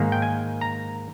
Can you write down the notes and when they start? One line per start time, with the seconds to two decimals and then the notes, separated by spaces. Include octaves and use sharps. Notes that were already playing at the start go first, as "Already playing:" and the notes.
Already playing: G#2 D#3 A#3
0.12 G5
0.22 G#5
0.61 A#5